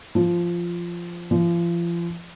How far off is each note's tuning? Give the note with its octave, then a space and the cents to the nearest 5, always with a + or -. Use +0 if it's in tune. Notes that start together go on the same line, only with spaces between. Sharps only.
F3 -10
F3 -35